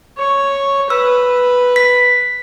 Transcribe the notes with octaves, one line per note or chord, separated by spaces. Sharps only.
C#5
B4 E6
B6